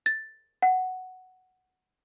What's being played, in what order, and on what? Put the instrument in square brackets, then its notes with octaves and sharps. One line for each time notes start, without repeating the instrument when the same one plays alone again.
[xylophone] A6
F#5